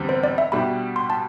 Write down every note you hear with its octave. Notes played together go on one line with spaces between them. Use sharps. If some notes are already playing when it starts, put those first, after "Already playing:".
Already playing: E2 D3 G3 C4
C5
D5
E5
B2 G3 D4 G4 B5
C6
A5